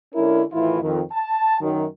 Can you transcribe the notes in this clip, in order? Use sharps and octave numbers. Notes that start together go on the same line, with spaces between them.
D3 G#3 C#4 E4 A#4
A2 D#3 E3 E4 F4
F2 D#3
A5
F#2 D#3